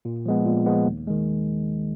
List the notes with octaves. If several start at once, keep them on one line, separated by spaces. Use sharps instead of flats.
A#2
F3 G#3 B3
A#2
F3 G#3 B3
D#2
D#3 G#3